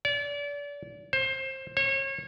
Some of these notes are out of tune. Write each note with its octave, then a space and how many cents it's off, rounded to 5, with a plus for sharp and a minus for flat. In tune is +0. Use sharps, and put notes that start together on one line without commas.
D5 -35
C5 +25
C#5 -35